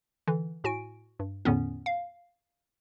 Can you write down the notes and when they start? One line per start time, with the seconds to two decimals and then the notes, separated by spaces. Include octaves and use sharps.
0.27 D3 E3
0.64 A2 F#4 G#5 D7
1.19 G2
1.45 E2 A2 D3 B3 C#4
1.86 F5